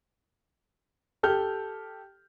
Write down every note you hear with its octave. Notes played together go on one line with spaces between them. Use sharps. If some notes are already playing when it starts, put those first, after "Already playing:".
G4 A4 G5 F6 G6